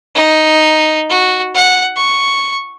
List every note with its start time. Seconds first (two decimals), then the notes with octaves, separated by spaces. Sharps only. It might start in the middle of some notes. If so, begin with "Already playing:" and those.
0.15 D#4
1.10 F#4
1.55 F#5
1.97 C#6